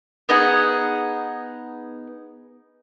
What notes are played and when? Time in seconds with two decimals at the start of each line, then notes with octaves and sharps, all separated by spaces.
0.29 B3 D#4 G#4 F#5